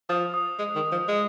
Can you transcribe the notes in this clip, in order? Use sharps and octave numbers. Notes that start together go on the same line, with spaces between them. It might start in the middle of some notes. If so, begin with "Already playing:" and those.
F3 D#6
D#6
G#3
D#3
F3
G#3